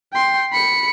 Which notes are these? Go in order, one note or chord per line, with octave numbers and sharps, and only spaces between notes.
G5 C6
B5 C#7